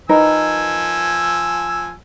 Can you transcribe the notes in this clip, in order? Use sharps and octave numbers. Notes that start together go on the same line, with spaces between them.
F3 D#4 A#4 B4 G#5 E6